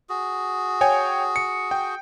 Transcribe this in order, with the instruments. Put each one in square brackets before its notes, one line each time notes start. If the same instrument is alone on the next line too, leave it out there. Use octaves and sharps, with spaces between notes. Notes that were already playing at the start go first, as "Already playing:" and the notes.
[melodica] F#4 G#4
[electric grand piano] C#5 G5 G#5
C#7
G5